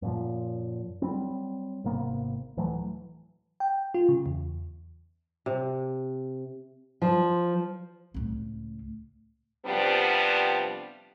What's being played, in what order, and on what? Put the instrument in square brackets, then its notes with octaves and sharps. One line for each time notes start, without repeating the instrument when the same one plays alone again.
[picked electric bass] F#2 A#2 F3
F#3 G3 C4
G#1 C3 A#3 B3
D1 E3 F#3 A3
[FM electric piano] G5
F4
C#3
E2
[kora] C3
[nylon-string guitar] F3
[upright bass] C#2 A2
[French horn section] C3 F3 G3 B3 D4 G4